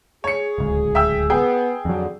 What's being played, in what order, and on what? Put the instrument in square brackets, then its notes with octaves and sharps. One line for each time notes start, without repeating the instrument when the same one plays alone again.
[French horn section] G#4 [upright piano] C#5 C#7
[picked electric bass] D1 C#2
[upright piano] E5 G5 E6
[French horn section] B3 [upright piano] G#4 G5
[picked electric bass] F2 F#3 [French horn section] D3